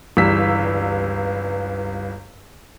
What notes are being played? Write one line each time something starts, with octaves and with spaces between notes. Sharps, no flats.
G1 C#2 E3 G3 E6 B6